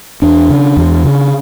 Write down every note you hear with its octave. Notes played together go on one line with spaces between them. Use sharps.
E2 D4
C#3
E2
C#3